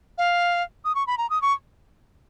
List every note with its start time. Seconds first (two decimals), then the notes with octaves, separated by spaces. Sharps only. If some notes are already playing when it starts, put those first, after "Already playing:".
0.18 F5
0.85 D#6
0.95 C#6
1.07 B5
1.18 A#5
1.30 D#6
1.42 C#6